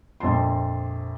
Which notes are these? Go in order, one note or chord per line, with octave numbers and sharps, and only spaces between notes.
A#1 F2 A5 C6